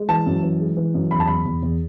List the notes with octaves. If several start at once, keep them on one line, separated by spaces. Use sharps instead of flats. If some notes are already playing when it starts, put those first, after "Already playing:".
Already playing: G#3
E3 A5
F#2
E3
G#3
E3
F#2
E2 B5
A5
E2 B5
E2
E2